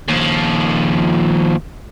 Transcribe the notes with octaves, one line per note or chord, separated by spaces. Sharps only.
D#2 F3